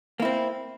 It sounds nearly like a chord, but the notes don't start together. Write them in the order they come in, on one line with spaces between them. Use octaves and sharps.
A#3 E4 C4